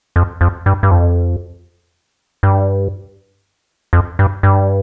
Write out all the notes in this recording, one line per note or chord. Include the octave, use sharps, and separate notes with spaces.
F2
F2
G2
G2
F2
G2
F2
G2
G2